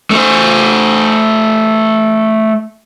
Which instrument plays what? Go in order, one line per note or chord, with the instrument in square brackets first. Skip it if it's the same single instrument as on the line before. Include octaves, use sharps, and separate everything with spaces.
[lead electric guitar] A3 C5